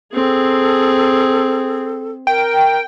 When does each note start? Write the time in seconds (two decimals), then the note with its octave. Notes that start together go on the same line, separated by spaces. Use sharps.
0.13 C4 G#4 A4
2.27 A#4 G5